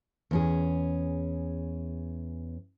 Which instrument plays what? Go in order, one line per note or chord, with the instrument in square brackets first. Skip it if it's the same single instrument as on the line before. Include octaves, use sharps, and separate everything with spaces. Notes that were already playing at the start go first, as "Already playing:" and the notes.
[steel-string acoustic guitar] E2 C#4 G#4